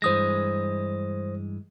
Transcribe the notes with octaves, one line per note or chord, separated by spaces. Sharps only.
G2 E3 G#3 C5 D#6 A#6